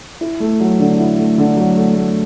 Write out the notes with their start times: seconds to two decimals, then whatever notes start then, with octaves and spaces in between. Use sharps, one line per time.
0.21 E4
0.40 A3
0.60 F#3
0.80 D3
0.99 E4
1.19 A3
1.38 D3
1.57 F#3
1.76 A3
1.96 A3